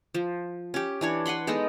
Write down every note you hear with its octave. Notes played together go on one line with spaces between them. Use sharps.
F3
C#4 G4
E3 D4 C#5
B4 F#5 B5 C6
G#3 B3 D#4 A4